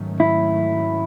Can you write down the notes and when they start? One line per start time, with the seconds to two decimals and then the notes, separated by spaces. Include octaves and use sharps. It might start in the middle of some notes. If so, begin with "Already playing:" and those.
Already playing: G#2 D#3 F#3 A3 C#4
0.20 E4